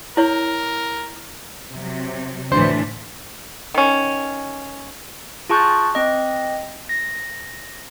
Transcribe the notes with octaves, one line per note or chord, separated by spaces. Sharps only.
E4 A#4 C#5
C3 F#3
D2 A2 E3 D4 C5 C#7
D#3 C#4
F4 G#4 A5 C#6 F#6 G6
C4 D#5
A#6